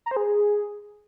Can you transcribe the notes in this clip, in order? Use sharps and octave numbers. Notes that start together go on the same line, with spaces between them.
A#5
C5
G#4